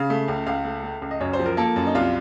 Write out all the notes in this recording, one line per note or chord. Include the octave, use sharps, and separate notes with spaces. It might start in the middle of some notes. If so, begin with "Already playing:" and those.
Already playing: C#3 F5
A3
C#2
C#2 F5
A3
A3
C#2
D#5
F#2 C#5
C5
F3
A#4
A#3 A4
F#2
D#4
C2 F4